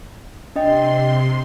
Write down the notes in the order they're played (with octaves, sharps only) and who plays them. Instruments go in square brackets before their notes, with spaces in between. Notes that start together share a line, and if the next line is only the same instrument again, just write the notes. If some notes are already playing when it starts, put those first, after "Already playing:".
[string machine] C3 C6 [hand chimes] D4 D#5 G5